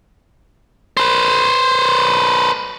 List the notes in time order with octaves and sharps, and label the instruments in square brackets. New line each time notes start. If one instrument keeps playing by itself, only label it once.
[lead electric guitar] B4 C5